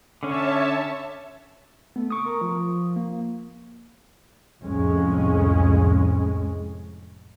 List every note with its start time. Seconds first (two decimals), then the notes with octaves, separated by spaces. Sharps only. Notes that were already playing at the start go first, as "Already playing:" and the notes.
0.23 D3 C#4 C#5 E5 A5
1.96 A3 B3
2.10 C#6 D#6
2.25 A#4
2.41 F3
2.96 A#3
4.63 C2 F2 A2 G#3 C#4